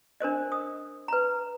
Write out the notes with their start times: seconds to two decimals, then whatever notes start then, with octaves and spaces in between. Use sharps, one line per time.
0.20 D4 A#4 C5 D#5
0.52 D#6
1.08 B4 A#5